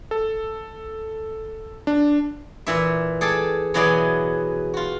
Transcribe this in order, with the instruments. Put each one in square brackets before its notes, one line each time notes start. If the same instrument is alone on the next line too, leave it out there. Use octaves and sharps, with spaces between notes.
[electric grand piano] A4
D4
[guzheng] A#2 E3 E5
G#4 A4 D5 G5 A5
B2 E3 F#3 E4 G#4 D5
F4 F#4